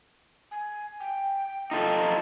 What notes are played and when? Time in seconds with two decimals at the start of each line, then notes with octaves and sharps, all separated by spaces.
0.51 G#5
1.00 G5
1.71 D#4 F4 A4